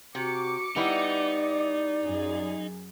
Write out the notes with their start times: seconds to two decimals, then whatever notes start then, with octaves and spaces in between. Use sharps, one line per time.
0.15 C3 F#4 D6 C#7
0.76 G3 B3 D#4 E4 D5
2.04 F#2 G#4